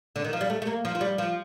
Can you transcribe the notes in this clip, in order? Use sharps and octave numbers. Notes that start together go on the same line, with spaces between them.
D3
D#3
F3
G3
A3
A3
A#3
F3
F3
G3
F3